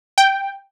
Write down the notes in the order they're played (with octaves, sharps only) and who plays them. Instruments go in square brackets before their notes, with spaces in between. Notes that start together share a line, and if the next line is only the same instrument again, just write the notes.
[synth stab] G5